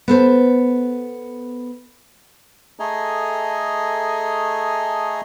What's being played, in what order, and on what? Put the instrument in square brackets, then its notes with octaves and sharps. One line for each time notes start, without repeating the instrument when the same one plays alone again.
[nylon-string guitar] B3 A4 C5
[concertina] A3 G#4 A4 D#5 G#5 A#5